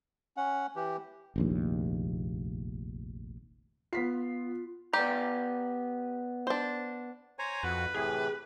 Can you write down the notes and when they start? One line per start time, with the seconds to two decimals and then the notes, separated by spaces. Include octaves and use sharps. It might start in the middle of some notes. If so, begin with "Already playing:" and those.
0.37 C#4 F#5
0.76 E3 G4
1.36 F1 A#1 D#2
3.93 B3 F4 B6 C7
4.93 B3 G4 D5 A#5
6.47 D4 C5
7.39 C5 C#5 G#5 A#5
7.63 F2 F#4 B4
7.94 A2 C3 E3 G#4